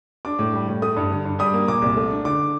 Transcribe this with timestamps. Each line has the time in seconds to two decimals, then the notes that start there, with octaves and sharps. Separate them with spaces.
0.25 D4 D6
0.39 A2
0.54 G3
0.68 A2
0.82 A3 D#6
0.96 G2
1.11 D3
1.25 G2
1.39 G3 D#6
1.53 A#3
1.68 A#2 D6
1.82 C2
1.97 A3
2.11 D4
2.25 D3 D6